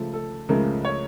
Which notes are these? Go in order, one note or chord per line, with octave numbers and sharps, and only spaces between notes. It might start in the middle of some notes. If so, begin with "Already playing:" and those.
Already playing: C#2 C#3 F3 A3 A4
A4
C#2 C#3 F3 A3 A#4
C#5